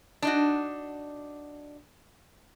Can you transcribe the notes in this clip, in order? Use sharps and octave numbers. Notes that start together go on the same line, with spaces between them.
D4 D#4 F#4